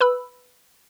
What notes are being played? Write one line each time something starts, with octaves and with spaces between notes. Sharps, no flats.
B4 B5 E6